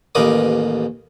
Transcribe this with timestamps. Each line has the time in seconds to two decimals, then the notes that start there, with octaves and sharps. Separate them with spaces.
0.15 A1 D#2 A#4 B4 D6 D#6